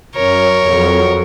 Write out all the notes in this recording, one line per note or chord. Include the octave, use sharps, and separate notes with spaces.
F#2 A#4 C#5
F2 F#3